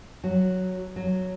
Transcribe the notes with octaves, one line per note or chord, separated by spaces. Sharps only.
F#3
F#3